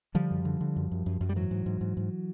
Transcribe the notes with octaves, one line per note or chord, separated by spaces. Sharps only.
D3 F3 G3
F#2
D3
D3
F#2
F#2
F#2
F#2
G3
G#2 E3 F#3
G#2
G#2
G#2
G#2